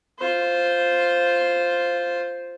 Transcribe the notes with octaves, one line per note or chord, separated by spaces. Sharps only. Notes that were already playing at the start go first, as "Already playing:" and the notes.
F4 C5